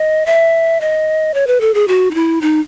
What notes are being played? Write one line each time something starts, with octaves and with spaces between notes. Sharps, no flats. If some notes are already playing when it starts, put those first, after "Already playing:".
Already playing: D#5
E5
D#5
C#5
B4
A4
G#4
F#4
D#4
E4
D#4